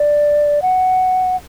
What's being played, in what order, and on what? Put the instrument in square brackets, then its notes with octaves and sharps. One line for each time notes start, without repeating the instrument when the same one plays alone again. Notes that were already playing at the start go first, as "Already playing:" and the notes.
Already playing: [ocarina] D5
F#5